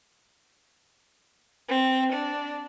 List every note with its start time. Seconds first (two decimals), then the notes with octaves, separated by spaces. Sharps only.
1.69 C4
2.13 D4